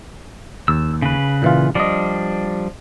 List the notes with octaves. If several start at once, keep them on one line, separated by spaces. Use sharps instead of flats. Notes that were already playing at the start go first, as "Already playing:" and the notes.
D#2 E6
C#3 B4
A#2 E3 F4
F3 G3 D4 D5 D#5